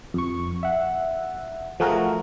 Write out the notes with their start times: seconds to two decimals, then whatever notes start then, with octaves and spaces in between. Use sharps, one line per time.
0.14 F2 C#6
0.63 E5 F#5
1.80 F3 A3 F#4 G#4 A#4